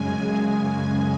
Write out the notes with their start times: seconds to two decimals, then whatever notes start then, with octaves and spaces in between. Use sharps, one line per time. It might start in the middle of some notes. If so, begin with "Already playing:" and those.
Already playing: F#2 C#3 G#3 G#5
0.25 G#5